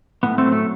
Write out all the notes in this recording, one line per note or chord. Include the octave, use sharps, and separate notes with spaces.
A2 B3
A3 C4
F#3
A3